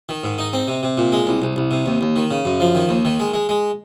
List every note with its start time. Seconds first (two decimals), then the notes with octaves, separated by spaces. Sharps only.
0.09 D#3
0.24 G#2
0.38 D#4
0.53 C4
0.68 C3
0.83 C3
0.98 A#2
1.12 G#3
1.27 C2
1.42 C2
1.56 C2
1.71 C3
1.86 D#2
2.01 D#2
2.16 D#3
2.31 C#3
2.45 F#2
2.60 F3
2.75 D#3
2.89 D#2
3.05 D#3
3.20 G#3
3.34 G#3
3.49 G#3